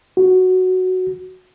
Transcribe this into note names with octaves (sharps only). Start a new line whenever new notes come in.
F#4